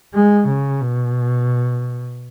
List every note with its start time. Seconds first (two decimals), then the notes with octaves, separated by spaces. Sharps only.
0.14 G#3
0.48 C#3
0.81 B2